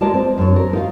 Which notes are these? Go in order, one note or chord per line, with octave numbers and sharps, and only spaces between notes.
G#3 F4 A#4 D5 D#5 A5
C4
F#2 D4 C#5
A#4
D#4 F4 F5